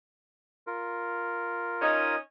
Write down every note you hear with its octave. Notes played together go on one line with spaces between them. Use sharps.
F4 A#4
C#4 D#4 D#5